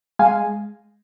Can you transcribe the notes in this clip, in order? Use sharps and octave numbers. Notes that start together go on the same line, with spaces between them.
G#3 F5 G#5